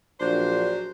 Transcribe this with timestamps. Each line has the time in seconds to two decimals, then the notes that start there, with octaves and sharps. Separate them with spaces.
0.20 A#1 F#3 D4 C5